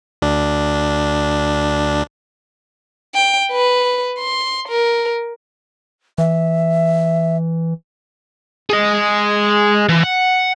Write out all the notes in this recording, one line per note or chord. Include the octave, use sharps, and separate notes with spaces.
D2 D4
G5
B4
C6
A#4
E3 E5
G#4 D#5
E3
F#5